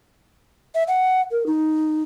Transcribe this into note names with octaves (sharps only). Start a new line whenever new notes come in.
E5
F#5
A#4
D#4